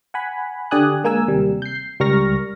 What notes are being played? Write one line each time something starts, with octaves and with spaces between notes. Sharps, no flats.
F#5 G#5 B5
D3 G4 D5 G#5 D#6 F#6
G#3 A#3 A#4 G#5 E6
D#2 C3 G3
G6 C7
C#2 G3 A#4 C#6 F6 A#6